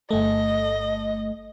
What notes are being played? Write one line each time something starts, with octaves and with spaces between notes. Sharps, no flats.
G1 A3 D#5